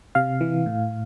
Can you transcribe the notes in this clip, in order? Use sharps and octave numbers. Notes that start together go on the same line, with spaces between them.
C3 F5
E3
A2